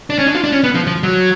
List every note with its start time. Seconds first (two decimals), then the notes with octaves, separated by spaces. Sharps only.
0.10 D4
0.19 C#4
0.27 D4
0.35 F4
0.44 D4
0.52 C#4
0.64 B3
0.75 F3
0.87 F3
1.03 F#3